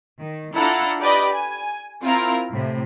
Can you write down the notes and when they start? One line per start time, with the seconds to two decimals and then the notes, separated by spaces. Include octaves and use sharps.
0.20 D#3
0.56 D4 E4 F4 A4 F#5 A#5
1.01 G4 B4 D5 D#5
1.33 G#5
2.03 C4 E4 F4 A#4
2.51 A2 C3